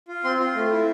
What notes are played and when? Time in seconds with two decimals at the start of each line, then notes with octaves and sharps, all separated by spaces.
0.08 F4
0.24 C4 C6
0.40 F4
0.55 A3
0.71 E4